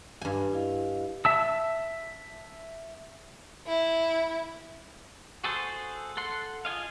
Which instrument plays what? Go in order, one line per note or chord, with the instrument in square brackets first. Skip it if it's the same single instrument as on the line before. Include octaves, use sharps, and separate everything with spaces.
[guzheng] G2 G#5
[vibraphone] E4 D#5 F5
[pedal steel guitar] E5 A5 E6
[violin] E4
[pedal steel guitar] F#4 G#4 A4 C5
A4 F#5 C6
F4 G#4 D#5 F5